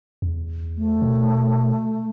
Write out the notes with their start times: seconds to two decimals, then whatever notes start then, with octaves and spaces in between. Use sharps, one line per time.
0.22 E2
0.77 A3
1.02 B2